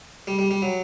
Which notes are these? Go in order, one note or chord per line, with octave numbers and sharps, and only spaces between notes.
G3
G3
G3
F#3